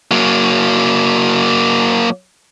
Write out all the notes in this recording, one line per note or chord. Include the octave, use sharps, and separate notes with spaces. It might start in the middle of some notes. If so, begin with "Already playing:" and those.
F#3 A#3